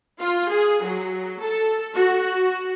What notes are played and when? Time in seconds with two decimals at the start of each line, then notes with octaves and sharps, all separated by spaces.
0.19 F4
0.49 G#4
0.83 F#3
1.40 A4
1.95 F#4